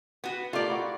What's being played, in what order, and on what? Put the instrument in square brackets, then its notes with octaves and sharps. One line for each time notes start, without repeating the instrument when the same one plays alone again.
[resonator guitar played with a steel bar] B3 F#4
[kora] A3 G4 A#4 [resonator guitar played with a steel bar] F4 D5
[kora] E4 F#4